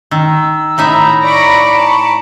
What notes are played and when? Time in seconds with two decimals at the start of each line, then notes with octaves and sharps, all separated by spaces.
0.11 D#3 E6
0.78 A2 D#4 E5 A#5 B5
1.23 D5 A#5 B5 C#6 A#6 D7
1.77 A5